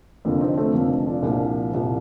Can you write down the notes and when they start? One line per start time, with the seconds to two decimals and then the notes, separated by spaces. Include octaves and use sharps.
0.25 F1 F2 D3 A#3
0.41 C4 D#4
0.57 A3 C4
0.74 F1 F2 D3 A#3
1.06 D4 F4
1.22 C2 A#2 F3
1.71 C2 A#2 F3